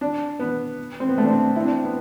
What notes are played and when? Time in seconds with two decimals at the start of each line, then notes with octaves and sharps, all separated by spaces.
0.01 D4
0.40 B3
1.00 C4
1.09 B3
1.18 A3
1.24 D4
1.30 C4
1.56 E4
1.61 C4
1.65 D4
1.84 B3